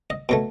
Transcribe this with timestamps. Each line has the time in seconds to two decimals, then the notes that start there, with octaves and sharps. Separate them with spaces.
0.10 D#5
0.29 B2 F#3 A3